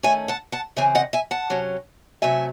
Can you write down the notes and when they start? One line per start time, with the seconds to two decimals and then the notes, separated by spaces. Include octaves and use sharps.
0.03 D#3 A3 C#4 E5 G#5
0.28 F#5 A5
0.52 F#5 A5
0.77 C#3 E3 C4 E5 G#5
0.95 D#5 F#5
1.13 E5 G#5
1.31 F#5 A5
1.50 C3 F#3 C#4
2.22 C3 F#3 A3 E5 G#5